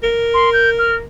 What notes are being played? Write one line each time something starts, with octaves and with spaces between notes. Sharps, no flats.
A#4
C6
G6
F6